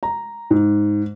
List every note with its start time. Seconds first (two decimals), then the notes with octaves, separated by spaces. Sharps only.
0.03 A#5
0.51 G#2